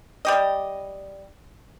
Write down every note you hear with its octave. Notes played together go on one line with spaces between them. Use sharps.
G3 G4 D#5